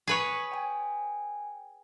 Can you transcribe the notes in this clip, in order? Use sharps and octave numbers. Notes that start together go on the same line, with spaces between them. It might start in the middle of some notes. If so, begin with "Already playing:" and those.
G#4 B4 C#5
G5 G#5